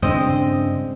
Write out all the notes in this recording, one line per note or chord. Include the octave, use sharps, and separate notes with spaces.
G2 C#3 G#3 C4 D4 D#5